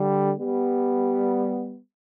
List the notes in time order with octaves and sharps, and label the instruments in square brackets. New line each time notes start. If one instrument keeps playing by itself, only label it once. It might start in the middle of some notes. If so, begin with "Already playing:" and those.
Already playing: [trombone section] D3 G3
G3 B3